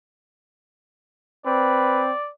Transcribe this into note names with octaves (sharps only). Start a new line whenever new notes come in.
C4 B4 D5